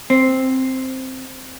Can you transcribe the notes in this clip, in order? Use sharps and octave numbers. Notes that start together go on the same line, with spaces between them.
C4